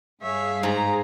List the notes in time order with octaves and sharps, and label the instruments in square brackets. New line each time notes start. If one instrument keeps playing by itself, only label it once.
[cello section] G2 G#4 F5 [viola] C#5 E5
[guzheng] G#2 [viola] G#3 A#5